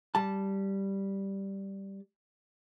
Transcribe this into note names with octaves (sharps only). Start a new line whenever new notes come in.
G3 A5